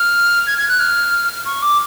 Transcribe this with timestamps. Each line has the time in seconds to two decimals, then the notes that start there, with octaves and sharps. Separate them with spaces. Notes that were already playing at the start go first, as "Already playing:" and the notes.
Already playing: F6
0.47 G#6
0.58 G#6
0.68 F#6
0.79 F6
1.46 C#6
1.62 D6